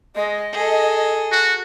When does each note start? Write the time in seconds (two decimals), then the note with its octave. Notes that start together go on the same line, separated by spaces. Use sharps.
0.15 G#3 D#5
0.52 G#4 A4
1.32 F#4